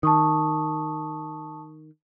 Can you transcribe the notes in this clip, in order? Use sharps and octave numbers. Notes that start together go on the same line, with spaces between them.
D#3 A5 C#6 D#6